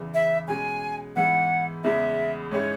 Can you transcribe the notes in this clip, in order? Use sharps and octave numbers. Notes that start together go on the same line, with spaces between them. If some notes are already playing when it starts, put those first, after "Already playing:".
Already playing: E2 C#3 E3
E5
B2 G#3 C#4 G#5
G#2 E3 B3 F#5
E2 C#3 G#3 B3 E5
G#2 G#3 C#4 E4 C#5